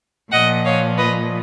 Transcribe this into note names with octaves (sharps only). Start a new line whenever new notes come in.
A#2 F3 D#5 F#5
C#5 F5
B4 D#5